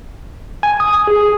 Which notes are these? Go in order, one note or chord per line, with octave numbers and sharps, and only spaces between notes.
G#5
D#6
G#4